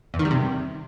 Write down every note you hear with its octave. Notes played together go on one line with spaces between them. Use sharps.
E2
D#3
G3
C3